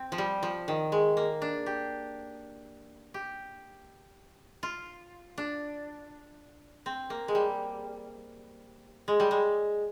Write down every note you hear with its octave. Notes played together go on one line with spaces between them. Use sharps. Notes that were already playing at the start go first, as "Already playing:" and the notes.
Already playing: C4
F3
G3
F3
D#3
G#3
A#3
D4
G4
G4
F4
D4
C4
A#3
G#3
G3
G#3
G3
G#3